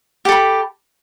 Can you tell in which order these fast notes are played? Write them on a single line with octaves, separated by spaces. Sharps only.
G4 A4 B5